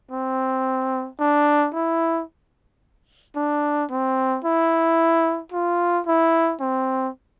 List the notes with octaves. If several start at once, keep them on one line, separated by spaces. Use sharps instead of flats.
C4
D4
E4
D4
C4
E4
F4
E4
C4